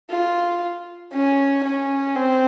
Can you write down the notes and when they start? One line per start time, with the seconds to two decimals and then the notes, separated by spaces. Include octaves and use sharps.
0.10 F4
1.13 C#4
1.64 C#4
2.16 C4